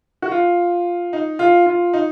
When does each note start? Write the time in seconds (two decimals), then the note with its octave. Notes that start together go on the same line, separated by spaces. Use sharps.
0.22 F#4
0.31 F4
1.13 D#4
1.39 F4
1.66 F4
1.93 D#4